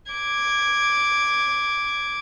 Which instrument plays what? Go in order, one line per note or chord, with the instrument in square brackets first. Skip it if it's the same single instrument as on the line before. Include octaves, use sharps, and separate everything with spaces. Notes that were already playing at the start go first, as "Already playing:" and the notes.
[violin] D6 G#6